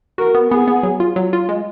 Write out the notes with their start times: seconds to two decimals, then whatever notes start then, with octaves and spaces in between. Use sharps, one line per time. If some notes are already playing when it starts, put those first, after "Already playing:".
0.18 F#4 A#4
0.35 B3
0.51 B3 G#4
0.68 B3
0.83 F#3
1.00 F4
1.16 F#3
1.33 F4
1.49 G#3